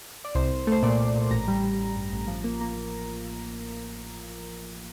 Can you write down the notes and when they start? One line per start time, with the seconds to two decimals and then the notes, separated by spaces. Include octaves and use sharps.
0.25 D5
0.35 C2 C5
0.52 C2
0.67 A3 C5
0.83 A#2 D5
0.99 A#2
1.15 A#2
1.31 A1 A#5
1.48 G3
1.63 A1
1.80 A1
1.96 G2
2.12 A1
2.27 F3
2.44 A#3
2.61 A#3